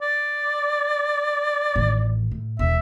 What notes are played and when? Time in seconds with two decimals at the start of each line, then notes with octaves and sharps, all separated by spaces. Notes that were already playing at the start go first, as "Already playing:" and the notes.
0.01 D5
1.76 A1 D#3
2.31 A2
2.59 E1 E2 E5